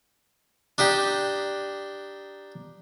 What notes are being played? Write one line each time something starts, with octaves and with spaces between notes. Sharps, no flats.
D4 D#4 G4